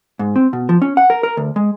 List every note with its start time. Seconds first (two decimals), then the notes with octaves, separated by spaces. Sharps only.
0.19 G#2
0.36 C4
0.53 B2
0.69 F3
0.82 C#4
0.97 F#5
1.10 A#4
1.23 A#4
1.37 D2
1.56 G#3